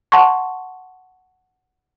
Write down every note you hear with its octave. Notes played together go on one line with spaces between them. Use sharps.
F#5 A5 C6 C#6